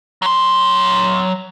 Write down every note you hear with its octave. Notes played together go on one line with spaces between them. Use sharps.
F#3 C6